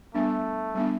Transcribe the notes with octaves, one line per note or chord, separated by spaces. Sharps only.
G3 A3 B3 D4
G3 B3 D4